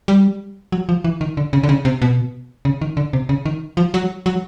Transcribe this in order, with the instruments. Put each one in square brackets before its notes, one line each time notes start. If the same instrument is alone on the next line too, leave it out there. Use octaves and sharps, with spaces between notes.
[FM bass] G3
F#3
F3
E3
D#3
D3
C#3
D3
C#3
C3
B2
C#3
D#3
D3
C3
C#3
D#3
F3
F#3
F#3